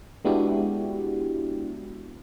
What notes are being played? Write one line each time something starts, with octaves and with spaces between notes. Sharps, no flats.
G#3 B3 D4 E4 F#4 G4